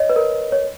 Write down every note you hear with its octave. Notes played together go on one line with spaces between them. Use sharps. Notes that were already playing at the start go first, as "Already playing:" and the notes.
Already playing: C#5 D#5
B4
A#4
C#5